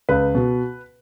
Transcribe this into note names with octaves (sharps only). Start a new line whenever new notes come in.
C#2 B4
B2